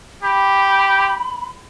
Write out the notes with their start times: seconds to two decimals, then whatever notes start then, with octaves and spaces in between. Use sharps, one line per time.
0.23 G4 B5